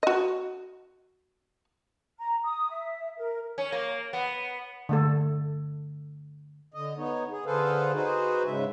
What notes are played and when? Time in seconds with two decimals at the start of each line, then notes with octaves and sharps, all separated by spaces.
0.03 F#4 D#5
2.19 A#5
2.44 D#6
2.70 E5
3.18 A#4
3.58 C#4
3.72 A#3
4.13 B3
4.89 D3 A3 A4
6.74 D3 D#5
6.97 B3 D#4 C#5
7.31 G#4
7.46 D3 G#4 A4 B4 C5 F5
7.93 D#4 F#4 G#4 B4 C5
8.46 G#2 C#3 G#3 E5